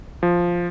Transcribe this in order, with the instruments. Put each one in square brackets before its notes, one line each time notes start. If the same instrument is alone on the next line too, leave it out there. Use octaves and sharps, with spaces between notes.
[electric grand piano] F3